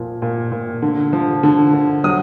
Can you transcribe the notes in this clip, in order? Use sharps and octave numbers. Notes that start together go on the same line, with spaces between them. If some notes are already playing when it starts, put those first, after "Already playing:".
Already playing: A#2 F3
A#2
A#2
D3
F3
D3
D3
F#3 D#6